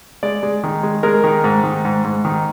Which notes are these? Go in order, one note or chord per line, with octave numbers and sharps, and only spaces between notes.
G#3 D5
G#3
D#3
G#3
G#3 A#4
D#3
G#2
D#3
G#2
G#2
D#3